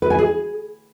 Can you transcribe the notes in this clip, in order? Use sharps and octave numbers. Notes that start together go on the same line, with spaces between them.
B4
G#5
G#4